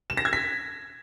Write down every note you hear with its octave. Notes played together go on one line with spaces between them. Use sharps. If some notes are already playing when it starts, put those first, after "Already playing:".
E7
A#6
G#6
B6